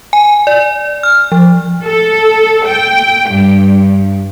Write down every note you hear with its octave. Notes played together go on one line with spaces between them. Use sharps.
G#5
D5
F6
F3
A4
G5
G2